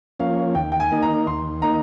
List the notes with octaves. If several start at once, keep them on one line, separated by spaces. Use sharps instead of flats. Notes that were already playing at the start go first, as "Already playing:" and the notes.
F3 A#3 C#4 F5
D#2 G5
G5
G#5
D#3 A#3 D#4
A#5
D#2 C6
D#3 A#3 D#4 A#5